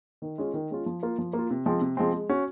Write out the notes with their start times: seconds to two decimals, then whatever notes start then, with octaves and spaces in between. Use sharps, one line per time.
0.22 D#3
0.38 G#3 C#4 F4
0.54 D#3
0.70 G#3 C#4 F4
0.86 F3
1.03 A#3 F4
1.18 F3
1.33 A#3
1.39 F4
1.51 C3
1.66 F3 G#3 C4
1.81 C3
1.97 F3 G#3 C4
2.13 G#3
2.29 C#4 F#4